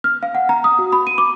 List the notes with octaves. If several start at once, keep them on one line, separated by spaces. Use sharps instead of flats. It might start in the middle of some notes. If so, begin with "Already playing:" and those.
F6
F5
F#5
A#5
D#6
F#4
B5
D#7
D6